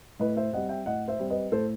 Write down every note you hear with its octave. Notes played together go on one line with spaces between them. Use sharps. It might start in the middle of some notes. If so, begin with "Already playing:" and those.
A2 B4 D#5
C5 E5
G3 C4 D#5 F#5
E5 G5
A2 D#5 F#5
C5 E5
G3 C4
B4 D#5
A2 A4 C5